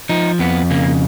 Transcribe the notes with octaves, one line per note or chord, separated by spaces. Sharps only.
F3 D#4
F2 B3
C#3 A#3